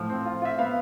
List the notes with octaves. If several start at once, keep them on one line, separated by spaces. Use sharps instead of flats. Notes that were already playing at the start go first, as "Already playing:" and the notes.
Already playing: A2 F3
C4
F4
F4 E5
B3 F5